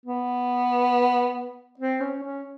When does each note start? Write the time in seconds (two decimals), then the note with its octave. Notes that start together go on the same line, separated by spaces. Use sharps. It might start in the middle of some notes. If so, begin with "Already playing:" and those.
0.06 B3
1.79 C4
2.01 C#4
2.22 C#4